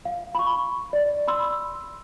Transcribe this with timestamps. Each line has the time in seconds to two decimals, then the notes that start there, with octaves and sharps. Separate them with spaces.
0.05 F5
0.35 B5 C#6
0.93 D5
1.28 B5 C6 E6